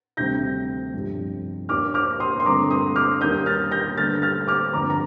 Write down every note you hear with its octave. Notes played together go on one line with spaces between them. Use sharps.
D2 C3 D#3 G3 C4 G6 A#6
G1 F2 C3 G3
D#2 D#3 A#3 D4 D6 F6
D6 F6
C6 D#6
C6
G2 D3 A3 C4 D#4 A#5 D6
C6 D#6
D6 F6
D#2 D#3 G3 A#3 D#6 G6
F6 A6
G6 A#6
G2 D3 A3 F6 A6
F6 A6
D6 F6
G1 F2 D3 A#5 D6
A#5